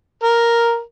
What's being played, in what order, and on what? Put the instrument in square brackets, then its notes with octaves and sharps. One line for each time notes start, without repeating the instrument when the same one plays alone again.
[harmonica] A#4